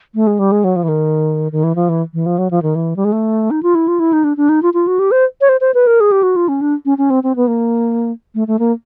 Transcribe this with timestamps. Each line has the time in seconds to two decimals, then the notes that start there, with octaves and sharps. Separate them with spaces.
0.15 A3
0.27 G#3
0.39 G3
0.52 G#3
0.64 F#3
0.76 F3
0.83 E3
0.88 D#3
1.52 D#3
1.64 E3
1.75 F3
1.89 E3
2.14 E3
2.26 F3
2.38 F#3
2.51 F3
2.62 D#3
2.75 E3
2.96 G3
3.05 G#3
3.12 A3
3.51 D#4
3.63 F4
3.75 E4
3.88 F4
4.00 E4
4.13 D#4
4.24 D4
4.37 D4
4.49 D#4
4.63 F4
4.74 F4
4.87 F#4
4.99 G4
5.11 C5
5.41 C#5
5.49 C5
5.61 C5
5.74 B4
5.87 A#4
6.00 G#4
6.12 G4
6.23 F#4
6.36 F4
6.48 C#4
6.61 D4
6.85 C#4
6.98 C#4
7.10 C4
7.23 C4
7.36 B3
7.47 A#3
8.35 A3
8.48 A3
8.59 A#3